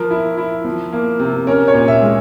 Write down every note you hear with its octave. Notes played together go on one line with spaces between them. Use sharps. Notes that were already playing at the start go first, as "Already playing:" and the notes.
Already playing: F3 A#4
E4
E4
F3
A#3
C3
C#4 A#4
C#5
A#2
E5
G#3